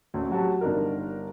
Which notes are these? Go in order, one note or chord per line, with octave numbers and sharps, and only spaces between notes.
D2 C#4
F#3 F#4 G4 A5
G1 D4 D#4 A#4